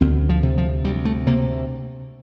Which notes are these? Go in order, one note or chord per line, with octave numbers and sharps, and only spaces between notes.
D2 C4
F3
C3
F3
D2 G3
A3
C3 A#3